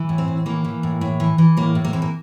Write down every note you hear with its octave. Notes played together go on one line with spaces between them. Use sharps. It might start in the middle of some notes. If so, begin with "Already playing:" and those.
Already playing: E3
A2
C4
A2
E3 A#3
E3
A2
A2
E3
E3
A2 A#3
A2
A#3
E3 C4
A#3